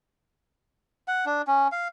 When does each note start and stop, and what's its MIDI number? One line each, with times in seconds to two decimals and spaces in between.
1.08 1.25 78
1.26 1.42 62
1.47 1.68 61
1.72 1.88 77